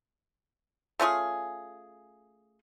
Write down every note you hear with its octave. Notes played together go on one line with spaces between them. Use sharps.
A3 C#4 F4 G#4